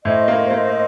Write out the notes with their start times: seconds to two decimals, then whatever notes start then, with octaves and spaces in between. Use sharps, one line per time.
0.04 A2 C5 D#5
0.28 A#3
0.50 A#3